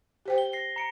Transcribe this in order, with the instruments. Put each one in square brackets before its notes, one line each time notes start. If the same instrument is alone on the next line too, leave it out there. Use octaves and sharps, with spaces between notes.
[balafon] G4 C5 G5
[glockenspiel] G7
A#6 C7 G7
A#5 C#7 D7